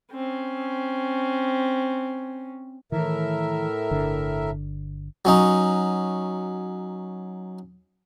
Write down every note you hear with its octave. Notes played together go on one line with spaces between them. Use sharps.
C4 C#4
A2 D#3 E3 A#4 E5
G1 D3
F#3 C#4 D#4